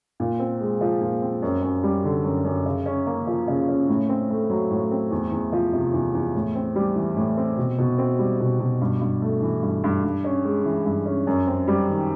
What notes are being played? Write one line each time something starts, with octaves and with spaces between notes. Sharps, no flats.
A#2
C4
G#3
F3
A#2
C4
F#2
F#2
G3
D3
F#2
F#2
C#3
C#4
A#3
F3
C#3
C#4
A2
C4
A3
F#3
A2
C4
E2
E2
F3
C3
E2
E2
A2
C4
G3
E3
A2
C4
B2
B2
C4
G3
B2
B2
G2
G2
A3
E3
G2
G2
G2
C#4
G#3
E3
G2
C#4
F#2
C4
G3
D#3